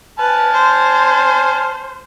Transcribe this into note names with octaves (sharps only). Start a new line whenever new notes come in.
B4 G#5 A5 F6
C5